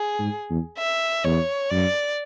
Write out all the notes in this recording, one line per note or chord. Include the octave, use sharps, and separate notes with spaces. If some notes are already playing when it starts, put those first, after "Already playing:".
Already playing: G#4
G#2
E2
E5
E2 C#5
F#2 D5